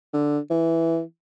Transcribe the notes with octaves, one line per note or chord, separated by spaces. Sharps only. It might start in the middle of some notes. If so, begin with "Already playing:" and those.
D3
E3